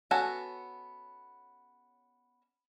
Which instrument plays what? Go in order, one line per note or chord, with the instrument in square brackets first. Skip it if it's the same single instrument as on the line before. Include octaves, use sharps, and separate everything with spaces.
[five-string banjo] B3 C#4 F#4 A4 C#5